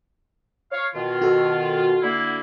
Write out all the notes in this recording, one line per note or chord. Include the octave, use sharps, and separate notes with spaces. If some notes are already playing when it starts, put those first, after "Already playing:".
C#5 F5
B2 D#3 F4
F#4 A4
D3 A#3 E4